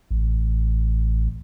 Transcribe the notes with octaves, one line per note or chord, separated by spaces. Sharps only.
A1